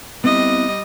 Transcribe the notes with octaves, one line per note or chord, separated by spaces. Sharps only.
G3 B3 C4 E4 D#5